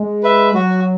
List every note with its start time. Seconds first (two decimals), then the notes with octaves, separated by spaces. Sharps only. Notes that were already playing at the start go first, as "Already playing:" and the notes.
Already playing: G#3
0.23 B4 E5
0.54 F#3 F#4